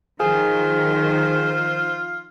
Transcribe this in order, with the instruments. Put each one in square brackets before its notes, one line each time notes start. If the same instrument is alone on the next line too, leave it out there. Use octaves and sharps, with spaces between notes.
[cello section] D#3 F3 [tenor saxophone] F4 [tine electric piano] G#4 [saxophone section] C5